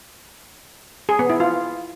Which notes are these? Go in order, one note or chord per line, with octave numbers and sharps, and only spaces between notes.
G#4
B3
E4
F4